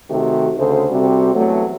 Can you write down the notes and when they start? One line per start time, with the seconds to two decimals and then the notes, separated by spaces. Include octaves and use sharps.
0.10 C3 D#3 A3 F#4 G4
0.58 D2 C#3 A4 C5
0.90 C3 G3 C4 F#4 A4
1.35 E2 F#3 A3